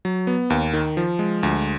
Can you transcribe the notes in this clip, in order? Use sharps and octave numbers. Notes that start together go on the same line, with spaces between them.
F#3
B3
D#2
D#3
F3
G#3
D2